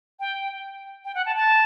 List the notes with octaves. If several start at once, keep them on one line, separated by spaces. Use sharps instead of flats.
G5
G5
F#5
A5
A5